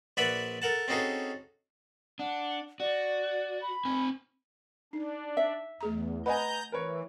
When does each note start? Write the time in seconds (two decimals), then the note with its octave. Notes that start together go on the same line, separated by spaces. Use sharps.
0.17 A#1 B4 D5 E5 F#5 B5
0.62 A4 A#4 F#5 A5
0.88 C4 C#4 D#4 F#4 G#4 A4
2.19 D4 F#5
2.80 F#4 D5
3.62 B5
3.85 C4 G#5
4.93 D4 D#4
5.37 E5
5.81 E2 A3 G#4 A#5
6.26 B4 D#5 F#5 G#5 A#5 G6
6.72 E3 A#4 B4 C#5